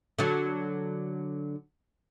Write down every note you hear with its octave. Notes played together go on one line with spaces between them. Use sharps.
D3 F#3